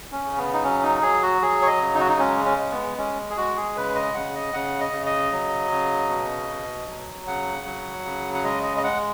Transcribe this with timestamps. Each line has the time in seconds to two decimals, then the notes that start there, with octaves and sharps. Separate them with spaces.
0.12 C#4
0.24 C#3
0.38 B3
0.53 D#4
0.63 F#3 C#4
0.83 D#4
1.02 F#3 G#4
1.22 F#4
1.42 F#3 G#4
1.62 C#5
1.67 D#5
1.81 C#3
1.94 D#4
2.00 F#4
2.08 D#4
2.19 G#3 C#4
2.45 C#4
2.58 G#3
2.71 B3
2.98 G#3 C#4
3.30 G#4
3.37 G#3 F#4
3.57 G#4
3.75 C#3 B4
3.95 D#5
4.15 C#3 F#5
4.35 D#5
4.53 C#3 F#5
4.81 D#5
4.93 C#3
5.06 D#5
5.32 F#3
5.71 C#3
6.09 B2
6.49 B2
6.88 F#3
7.27 C#3 F#5
7.67 F#3
8.05 C#3
8.34 F#5
8.44 G#3 D#5
8.63 D#5
8.77 D#5
8.83 G#3 F#5